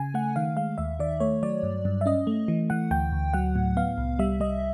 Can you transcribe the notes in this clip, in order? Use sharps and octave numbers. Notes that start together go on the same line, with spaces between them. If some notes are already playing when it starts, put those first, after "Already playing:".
Already playing: C#3 G#5
A3 F#5
D#3 F5
G#3 F5
D#2 E5
D#3 D5
A3 C#5
F#3 D5
G2
G2
E5
C#4 D#5
A3
E3
E3 F#5
D2 G5
D2
F#3 F#5
A2
B3 F5
C2
G3 E5
G3 D#5